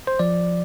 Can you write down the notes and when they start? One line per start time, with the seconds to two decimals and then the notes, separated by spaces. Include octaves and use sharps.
0.07 C5
0.19 F3 D5